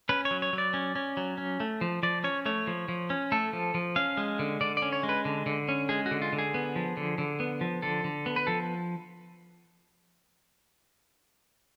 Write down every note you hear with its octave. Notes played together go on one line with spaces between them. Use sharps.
C#4 B4
C#5
F#3
C#5
F#3
D5
C#4
C#4
F#3
C#4
A3
F3
F3 D5
C#4 C#5
A3 C#5
F3
F3
C#4
A3 A4
F3
F3
C#4 F5
G#3
D3
D3 D5
D5
C#4
C#5
G#3
B4
D3
D3
C#4
G#3 G#4
F#4
D3
F4
D3
G#4
B3
F3
D3
D3
B3
F3
D3 A4
D3
B3
B4
F3 A4